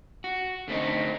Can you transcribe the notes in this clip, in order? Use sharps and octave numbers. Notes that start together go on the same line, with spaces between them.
F#4
D3 A3 C4 D#4